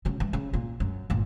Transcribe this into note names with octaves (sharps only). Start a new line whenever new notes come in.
C#3 F#3
E3 G3
C#3
A#2
F#2
G1 A#2